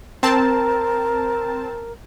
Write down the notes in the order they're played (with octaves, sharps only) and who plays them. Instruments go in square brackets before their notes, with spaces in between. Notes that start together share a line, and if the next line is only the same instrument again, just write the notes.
[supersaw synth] C4 A5 [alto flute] A#4